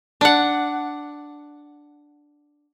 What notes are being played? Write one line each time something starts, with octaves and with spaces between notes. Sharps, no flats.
D4 F#5